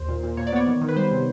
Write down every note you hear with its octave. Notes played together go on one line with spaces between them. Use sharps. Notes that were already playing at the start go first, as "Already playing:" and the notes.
Already playing: D#2 C5
A#2
A#2
A#2 C#5
D5
B3 C#5
D#3
D#3
B4
G3 C5
C3